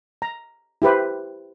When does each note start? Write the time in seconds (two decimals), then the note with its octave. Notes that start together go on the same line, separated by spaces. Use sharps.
0.22 A#5
0.82 E4 G4 B4 C5